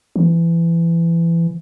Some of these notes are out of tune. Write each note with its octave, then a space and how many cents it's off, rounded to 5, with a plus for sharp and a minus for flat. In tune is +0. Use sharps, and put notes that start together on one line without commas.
E3 +25